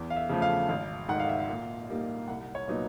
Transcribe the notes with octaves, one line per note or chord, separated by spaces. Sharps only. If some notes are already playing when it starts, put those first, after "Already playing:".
Already playing: E2
F5
E5
C#3 F3 A3
F5
G#1 F5
G#2 D#3 F#5
F5
E5
F5
A#2
G3 A#3 D#4
C2 F#5
C#5
A#2 F#3 B3 D#4